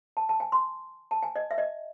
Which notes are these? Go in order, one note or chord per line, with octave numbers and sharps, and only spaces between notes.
A5
A5
G#5
C6
A5
G#5
D#5
E5
D#5